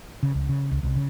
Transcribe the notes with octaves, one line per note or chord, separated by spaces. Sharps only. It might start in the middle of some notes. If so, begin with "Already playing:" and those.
C#3
C#2
C#3
C#2
C2
C#3